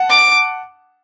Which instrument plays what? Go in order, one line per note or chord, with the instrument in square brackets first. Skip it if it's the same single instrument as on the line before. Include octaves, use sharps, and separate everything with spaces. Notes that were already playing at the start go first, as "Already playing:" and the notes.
Already playing: [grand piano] F#5 A5
[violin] D6